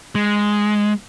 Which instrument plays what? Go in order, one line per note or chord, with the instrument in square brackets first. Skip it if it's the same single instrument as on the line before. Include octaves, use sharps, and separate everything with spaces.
[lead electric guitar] G#3